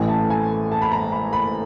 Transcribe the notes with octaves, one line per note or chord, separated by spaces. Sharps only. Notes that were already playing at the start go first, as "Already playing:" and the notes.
Already playing: A1 A2 E3 G#5
A5
G#5
A5
B5
A#5
B5
B5